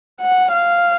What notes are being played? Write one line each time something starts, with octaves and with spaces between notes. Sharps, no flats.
F#5
F5